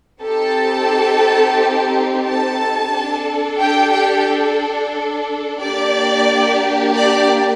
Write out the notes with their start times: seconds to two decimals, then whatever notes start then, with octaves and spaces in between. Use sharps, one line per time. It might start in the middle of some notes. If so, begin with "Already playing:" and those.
0.22 C4 D#4 G4 A4 A5
2.24 A4 A5
2.92 D4 A4
3.59 G4 G5
3.92 G4 G5
5.60 A#3 D4 G4 D5
6.95 D5